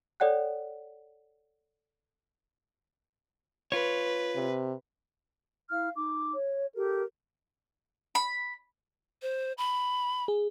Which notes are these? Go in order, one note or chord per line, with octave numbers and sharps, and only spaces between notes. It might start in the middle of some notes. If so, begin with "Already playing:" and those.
A4 C#5 D5 F#5 G5 F#6
F4 B4 C#5
C3
E4 F5 F6
D#4 D6
C#5
G4 A4 A#4
B5
C5
B5
G#4